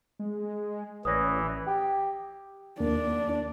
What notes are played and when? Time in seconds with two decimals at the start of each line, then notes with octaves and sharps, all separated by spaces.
0.19 G#3
1.05 A1 E3 B4 C#5 D5 D#6 A#6
1.67 G4
2.80 D#2 A#3 D4